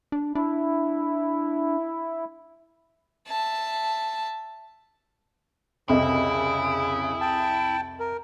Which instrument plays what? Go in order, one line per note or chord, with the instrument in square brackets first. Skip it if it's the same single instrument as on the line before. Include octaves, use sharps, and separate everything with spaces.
[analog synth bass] D4
[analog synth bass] D4 [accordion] E4
[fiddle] E5 A5
[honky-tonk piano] C2 F2 D#5 [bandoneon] C#3 [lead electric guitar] E4 [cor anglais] G#4
[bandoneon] G5 A5
A#4